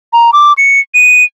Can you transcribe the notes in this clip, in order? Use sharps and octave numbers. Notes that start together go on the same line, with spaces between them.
A#5
D6
C#7
D#7